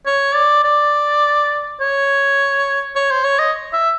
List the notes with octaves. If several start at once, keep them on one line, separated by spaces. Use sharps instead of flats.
C#5
D5
D5
C#5
C#5
C5
C#5
D#5
E5